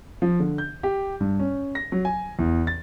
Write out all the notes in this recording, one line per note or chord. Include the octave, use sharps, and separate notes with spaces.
F3
D3
G6
G4
G2
C#4
A#6
F#3
G#5
E2
A6